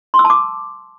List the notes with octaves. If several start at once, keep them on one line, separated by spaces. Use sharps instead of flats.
C6
E6
A5
D6